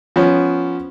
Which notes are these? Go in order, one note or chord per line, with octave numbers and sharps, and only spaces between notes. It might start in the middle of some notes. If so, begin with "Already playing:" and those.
F3 B3 C#4